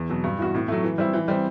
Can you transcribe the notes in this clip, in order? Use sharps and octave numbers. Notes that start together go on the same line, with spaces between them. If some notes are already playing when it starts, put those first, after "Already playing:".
Already playing: E2
B2 F#3
G2
E3 B3 F#4
A2
F#3 A3
E3
G3 C4 E4
E3
G3 C4